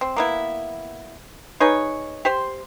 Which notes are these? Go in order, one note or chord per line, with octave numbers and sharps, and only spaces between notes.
C4
A#3 B3 E4
D#4 G#4 B4 C#5
G4 C5 C6